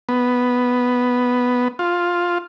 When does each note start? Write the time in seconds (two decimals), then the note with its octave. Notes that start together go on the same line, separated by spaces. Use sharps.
0.09 B3
1.79 F4